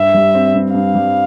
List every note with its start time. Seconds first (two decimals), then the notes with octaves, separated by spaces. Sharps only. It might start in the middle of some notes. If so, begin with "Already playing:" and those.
Already playing: G2 E5
0.14 G3
0.34 C4
0.55 G2
0.74 G2 F5
0.95 G3